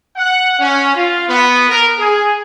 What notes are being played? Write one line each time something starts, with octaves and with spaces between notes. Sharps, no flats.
F#5
C#4
F4
B3
A#4
G#4